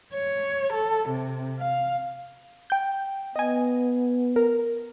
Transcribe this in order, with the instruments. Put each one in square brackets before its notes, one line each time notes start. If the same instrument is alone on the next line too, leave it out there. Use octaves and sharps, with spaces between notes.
[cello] C#5
A4
C3
F5
[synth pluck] G5 G6
[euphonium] B3 [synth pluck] D#5 G#5
[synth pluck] A#4